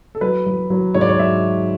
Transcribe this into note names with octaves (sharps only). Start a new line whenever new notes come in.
A4
F#3 B4
F#3
F#3
G#2 C#5
D5
C#5
F#3 E5